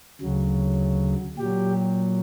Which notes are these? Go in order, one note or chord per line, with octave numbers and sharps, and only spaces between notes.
D2 C#3 F#3
A#2 F#3 G4